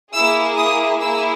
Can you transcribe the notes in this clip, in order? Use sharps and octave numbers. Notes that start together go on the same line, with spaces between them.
A#3 E4 G#4 E6
D#6
A#3 E4 G#4 E6